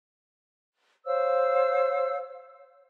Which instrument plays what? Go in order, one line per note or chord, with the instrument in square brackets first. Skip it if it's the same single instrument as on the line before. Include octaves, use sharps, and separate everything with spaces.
[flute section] C5 C#5 F5 E6